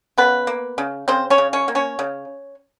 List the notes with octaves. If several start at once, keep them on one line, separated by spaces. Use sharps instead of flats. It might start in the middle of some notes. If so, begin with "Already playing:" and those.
C#3 B3 B4
A#3
C#3
C#3 C4 C5
C#4 C#5
C#3
C#4 C#5
A#3
C#4 C#5
C#3